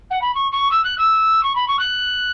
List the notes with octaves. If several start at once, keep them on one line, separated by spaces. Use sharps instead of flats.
F#5
B5
C#6
C#6
E6
F#6
E6
C#6
B5
C#6
F#6